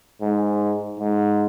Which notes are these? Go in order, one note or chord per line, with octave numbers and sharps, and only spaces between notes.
G#2
G#2